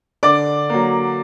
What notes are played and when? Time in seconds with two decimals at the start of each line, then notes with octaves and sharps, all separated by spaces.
0.23 D3 D5 D6
0.70 F#3 A#3